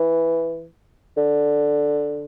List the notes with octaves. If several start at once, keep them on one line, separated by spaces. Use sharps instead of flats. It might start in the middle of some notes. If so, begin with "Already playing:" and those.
Already playing: E3
D3